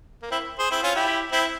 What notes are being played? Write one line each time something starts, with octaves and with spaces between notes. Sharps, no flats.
A#3
C4 E4
G#4 C5
C4 E4
C#4 F4
E4 G4
C4 E4